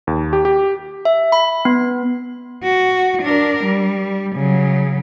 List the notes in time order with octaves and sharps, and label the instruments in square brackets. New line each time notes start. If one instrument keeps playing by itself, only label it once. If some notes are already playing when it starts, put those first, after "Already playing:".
[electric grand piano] D#2
G4
G4
[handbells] E5
B5
B3
[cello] F#4
D4 A#4
G3
C#3 F#3